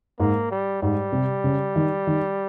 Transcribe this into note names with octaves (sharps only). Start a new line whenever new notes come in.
G#2 A#3
G3
G#2 G3
C3
C#3
D#3
D#3